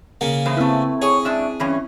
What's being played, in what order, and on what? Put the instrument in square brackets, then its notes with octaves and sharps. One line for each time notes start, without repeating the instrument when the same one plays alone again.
[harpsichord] C#3 A#3
[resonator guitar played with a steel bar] E3 D#4 C5
[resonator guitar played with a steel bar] A3 B4 [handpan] C4 E4
[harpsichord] G#4 [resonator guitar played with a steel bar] C#5
[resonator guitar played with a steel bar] G#2 D4 E5
G2 E3 C#4